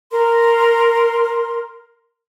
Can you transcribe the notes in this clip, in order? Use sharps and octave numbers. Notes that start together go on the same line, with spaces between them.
A#4 C6